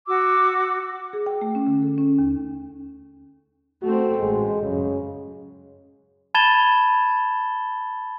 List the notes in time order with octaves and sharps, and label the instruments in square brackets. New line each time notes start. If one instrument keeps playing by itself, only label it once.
[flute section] F#4 D6 E6
[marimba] G#4
G5
A3
C#4
D3
A4
C#4
D#2
[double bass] A3 C4 [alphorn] F#4
[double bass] A1 [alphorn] G#3
[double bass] F#2 [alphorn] C#3
[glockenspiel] A5 B5 G#6 A6 E7 G7